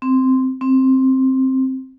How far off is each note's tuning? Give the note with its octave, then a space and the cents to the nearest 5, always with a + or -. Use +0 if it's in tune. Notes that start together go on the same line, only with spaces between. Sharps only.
C4 -5
C4 +10